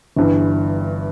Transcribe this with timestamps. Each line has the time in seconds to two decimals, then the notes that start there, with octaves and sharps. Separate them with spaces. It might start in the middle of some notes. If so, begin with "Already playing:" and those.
0.16 G1 G2 E3